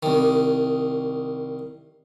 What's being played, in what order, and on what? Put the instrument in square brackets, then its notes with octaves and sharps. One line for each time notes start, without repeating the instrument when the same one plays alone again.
[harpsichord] C2 D#3